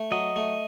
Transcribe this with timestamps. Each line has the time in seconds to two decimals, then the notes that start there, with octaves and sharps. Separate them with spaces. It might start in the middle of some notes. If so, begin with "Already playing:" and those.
Already playing: A3
0.11 F#3 D#5
0.36 A3